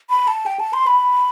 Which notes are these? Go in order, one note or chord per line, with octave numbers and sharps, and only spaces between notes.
B5
A5
G5
A5
C6
B5